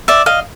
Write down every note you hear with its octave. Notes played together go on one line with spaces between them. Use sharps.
D5 E5
D#5 F5